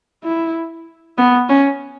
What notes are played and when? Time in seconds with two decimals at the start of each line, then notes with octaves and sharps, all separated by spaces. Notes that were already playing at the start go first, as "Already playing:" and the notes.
0.24 E4
1.18 B3
1.49 C#4